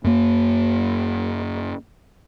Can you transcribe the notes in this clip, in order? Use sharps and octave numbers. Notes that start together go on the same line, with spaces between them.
F#2 A#3